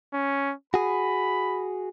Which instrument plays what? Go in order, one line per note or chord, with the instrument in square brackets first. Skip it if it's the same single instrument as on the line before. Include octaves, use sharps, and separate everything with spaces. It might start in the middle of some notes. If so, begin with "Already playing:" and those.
[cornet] C#4
[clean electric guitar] F#4 G#4 [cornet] B5